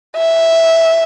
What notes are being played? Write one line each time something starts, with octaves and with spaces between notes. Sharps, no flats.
E5